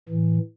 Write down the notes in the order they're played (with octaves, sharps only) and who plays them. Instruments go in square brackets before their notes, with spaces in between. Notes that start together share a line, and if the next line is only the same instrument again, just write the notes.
[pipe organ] A2 E3